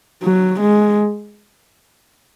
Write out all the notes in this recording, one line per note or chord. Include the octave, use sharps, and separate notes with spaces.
F#3
G#3